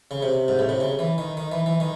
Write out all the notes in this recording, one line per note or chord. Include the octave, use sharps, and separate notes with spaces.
C#3
C3
G#2
A2
C3
C#3
E3
D#3
D#3
E3
E3
D#3